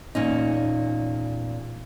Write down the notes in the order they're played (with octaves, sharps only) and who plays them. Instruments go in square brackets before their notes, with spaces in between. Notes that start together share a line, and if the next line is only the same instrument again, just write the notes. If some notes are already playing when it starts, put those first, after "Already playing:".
[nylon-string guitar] E2 A#2 C#4 D#4